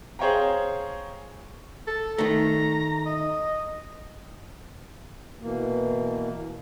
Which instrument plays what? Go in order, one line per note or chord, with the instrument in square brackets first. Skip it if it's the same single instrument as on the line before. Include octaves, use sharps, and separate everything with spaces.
[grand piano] G#4 C5 C#5 F5 G5 A#5
[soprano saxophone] A4
[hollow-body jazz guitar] D#3 A3 [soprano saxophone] A#5
[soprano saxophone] D#5
[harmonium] B2 E3 A#3